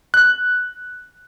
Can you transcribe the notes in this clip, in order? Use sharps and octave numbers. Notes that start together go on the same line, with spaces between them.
F#6